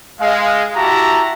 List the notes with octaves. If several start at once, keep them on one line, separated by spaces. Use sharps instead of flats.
G#3 F5
E4 F#4 G4 E5 A5 A#5